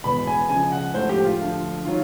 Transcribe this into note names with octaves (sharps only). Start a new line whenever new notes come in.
E2 B2 G#3 B5
G#5
C#2 C#3 F3 G#3 G#5
F#5
A2 F3 G#3 C5
G4
F4
D2 D3 F3
D#3 F#3 F4